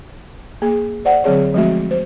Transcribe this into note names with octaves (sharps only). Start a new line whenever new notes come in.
A#3 G#4
C5 D5 F#5
D3 F#3 C4 G#4 C#5
F3 G#3 A3 C4 F#4 E5
C5